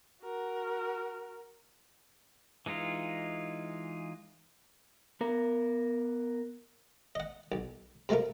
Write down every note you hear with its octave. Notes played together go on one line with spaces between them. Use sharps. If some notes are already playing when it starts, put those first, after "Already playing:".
F#4 A#4
E3 G#3 D#4 F4
B3 A#4
D#5 F#5
B1
C3 G#3 A3 F4 A#4